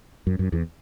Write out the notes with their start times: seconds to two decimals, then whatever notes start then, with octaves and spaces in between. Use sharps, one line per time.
0.27 F#2
0.39 F#2
0.52 E2